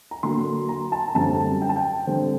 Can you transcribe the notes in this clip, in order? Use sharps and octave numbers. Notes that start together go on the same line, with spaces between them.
A#5
D3 F#3 A#3 C6
A#5
A5
A#5
F#2 D3 G3 C4 A5
G5
A5
G5
D3 G3 C4